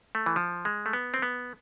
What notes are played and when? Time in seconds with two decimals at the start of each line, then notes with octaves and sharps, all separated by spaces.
0.15 A3
0.26 E3
0.36 F3
0.65 G#3
0.86 A3
0.93 B3
1.14 C4
1.22 B3